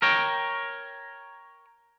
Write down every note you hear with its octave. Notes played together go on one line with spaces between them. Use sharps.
A#4 C#5 G5